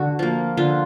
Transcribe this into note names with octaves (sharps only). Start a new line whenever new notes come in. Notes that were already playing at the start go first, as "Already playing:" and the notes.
Already playing: D3 F#4
F3 A#3
D3 F4